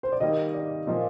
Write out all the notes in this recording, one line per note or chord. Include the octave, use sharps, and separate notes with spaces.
C5
D5
D#3 G3 A#3 D#5
D5
A#2 F3 A#3 D#5